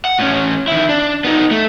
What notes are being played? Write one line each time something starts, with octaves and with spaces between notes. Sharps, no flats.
F#5
A2 C#4
D#3 E4
D4
B3 D#4
A3